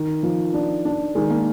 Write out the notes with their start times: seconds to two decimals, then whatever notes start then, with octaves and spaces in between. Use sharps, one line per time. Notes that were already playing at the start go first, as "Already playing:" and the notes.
Already playing: D#3
0.23 F3
0.54 D4
0.85 D4
1.15 D#3 G#3
1.30 A#3